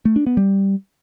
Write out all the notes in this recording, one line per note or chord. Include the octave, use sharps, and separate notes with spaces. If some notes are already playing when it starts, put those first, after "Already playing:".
A3
D4
B3
G3